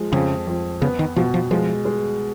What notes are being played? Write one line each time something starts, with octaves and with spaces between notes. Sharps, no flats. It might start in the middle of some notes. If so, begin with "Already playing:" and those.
Already playing: F3 G#3
F2 C#3
F2
C#3 B3
D#3
B2 F3
F3
F3 G#3
G#3